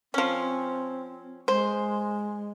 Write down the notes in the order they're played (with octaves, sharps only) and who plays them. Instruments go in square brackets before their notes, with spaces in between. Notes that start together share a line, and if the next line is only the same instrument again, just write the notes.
[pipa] F3 C#4 [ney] C4
[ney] G#3 [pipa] C5